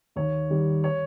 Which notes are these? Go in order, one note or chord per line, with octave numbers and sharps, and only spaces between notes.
D#2 C#5
D#3 G3
C#5